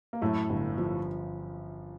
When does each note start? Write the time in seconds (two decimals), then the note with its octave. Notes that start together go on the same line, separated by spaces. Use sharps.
0.13 A#3
0.22 F#2 A2 A3
0.50 G1
0.78 F3